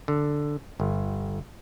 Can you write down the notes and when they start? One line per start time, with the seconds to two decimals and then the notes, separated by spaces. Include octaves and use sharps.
0.08 D3
0.80 G1